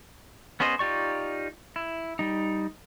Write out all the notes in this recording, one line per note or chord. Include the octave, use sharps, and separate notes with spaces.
B3 C#4 G#4 C5 D#5
D#4 F4 G4 D5 C#6
E4
G3 D#4